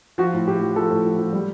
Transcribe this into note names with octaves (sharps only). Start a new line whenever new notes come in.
F3 F#4
A2
A2 G4
F3
F3 A4
A2
F3
F3
G3